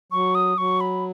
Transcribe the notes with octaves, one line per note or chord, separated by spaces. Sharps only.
F#3 C#6
D#6
F#3 C#6
B5